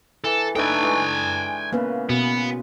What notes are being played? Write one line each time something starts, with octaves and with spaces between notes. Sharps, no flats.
E3 A4
A3 D4 D#4 A4 B4 G5 G#5
E3 G#3
C#3 A#3 B3 B4
B2 B3